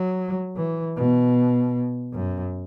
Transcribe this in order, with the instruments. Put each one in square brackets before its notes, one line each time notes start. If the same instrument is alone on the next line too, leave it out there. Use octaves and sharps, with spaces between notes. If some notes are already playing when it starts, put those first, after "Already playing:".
Already playing: [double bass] F#3
E3
B2
F#2